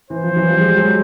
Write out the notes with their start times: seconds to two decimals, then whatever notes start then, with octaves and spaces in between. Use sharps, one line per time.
0.10 E3 C5
0.23 F3
0.36 E3 F#3
0.48 F3 G3
0.60 G#3
0.68 G3
0.76 F#3 G#3